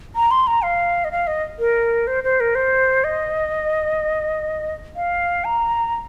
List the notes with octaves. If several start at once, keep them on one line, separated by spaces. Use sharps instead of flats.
A#5
C6
A#5
F5
D#5
F5
D#5
A#4
C5
C5
A#4
C5
D#5
F5
A#5